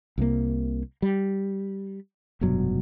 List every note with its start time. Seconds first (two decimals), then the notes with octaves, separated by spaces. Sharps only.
0.18 C2 C3 A#3
1.02 G3
2.41 F1 G2 B2 F#3